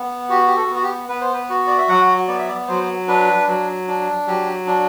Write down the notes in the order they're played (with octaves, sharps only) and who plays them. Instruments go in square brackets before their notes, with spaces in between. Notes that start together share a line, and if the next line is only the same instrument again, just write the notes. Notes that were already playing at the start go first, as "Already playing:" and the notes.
Already playing: [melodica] B3
F#4 G4
G4
A4
B3
F#4
G4
B3 B4
C5
B4
F#4
D5
E5
F#3 F#5
B3 D5
E5
D5
F#3 C5
D4 B4
F#3
D4
F#3 G4
D4